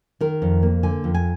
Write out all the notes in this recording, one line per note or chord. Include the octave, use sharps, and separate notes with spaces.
D#3 A#4
F2
A#3
D3 G#5
F2
G#5